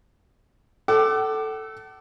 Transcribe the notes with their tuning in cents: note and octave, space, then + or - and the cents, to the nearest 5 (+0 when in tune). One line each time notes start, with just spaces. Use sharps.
A4 +0 F#5 +45 D6 +15